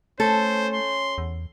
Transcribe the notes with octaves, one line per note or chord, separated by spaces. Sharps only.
A3 C#4 A4 C5
C6
E2